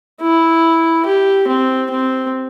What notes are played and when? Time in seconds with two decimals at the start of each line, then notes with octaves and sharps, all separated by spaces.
0.21 E4
1.06 G4
1.47 C4
1.91 C4